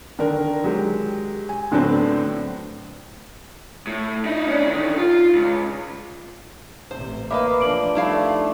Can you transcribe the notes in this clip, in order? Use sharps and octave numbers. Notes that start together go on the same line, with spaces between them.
D3 D#3 D4 A#4
F#3 G#3 G4
G#5
A2 D3 F#3 B3 C4 D4
A2
D#4 E4
C#4 D4
D3 D#3
F4
C#2
A1 C3 C5
A#3 B4 D#5 E5 B5 D6
F3 D4 D7 F#7
G3 A3 D#4 E4 F5